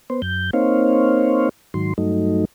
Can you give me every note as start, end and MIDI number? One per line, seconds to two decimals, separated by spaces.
0.10 0.22 59
0.10 0.22 72
0.22 0.51 42
0.22 0.51 91
0.53 1.49 58
0.53 1.49 60
0.53 1.49 63
0.53 1.49 72
0.53 1.49 73
0.53 1.49 77
1.74 1.93 44
1.74 1.93 51
1.74 1.93 54
1.74 1.93 84
1.98 2.45 43
1.98 2.45 54
1.98 2.45 57
1.98 2.45 63